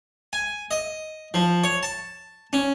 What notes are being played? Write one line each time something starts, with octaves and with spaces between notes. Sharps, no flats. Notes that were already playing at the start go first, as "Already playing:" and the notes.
G#5
D#5
F3
C#5
A5
C#4